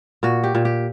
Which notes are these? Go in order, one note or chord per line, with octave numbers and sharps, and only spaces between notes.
A#2 F#4
G4
A#2
G4